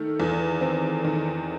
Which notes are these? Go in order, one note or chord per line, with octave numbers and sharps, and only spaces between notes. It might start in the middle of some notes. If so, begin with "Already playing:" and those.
Already playing: D#3 A3 A4
E2
C4
D#3